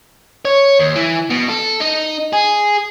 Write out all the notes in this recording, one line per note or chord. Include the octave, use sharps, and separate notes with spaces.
C#5
D#2
E3
B2
A4
D#4
G#4